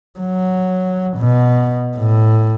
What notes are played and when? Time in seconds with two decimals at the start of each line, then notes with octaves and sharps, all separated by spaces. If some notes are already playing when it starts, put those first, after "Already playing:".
0.19 F#3
1.18 B2
1.97 A2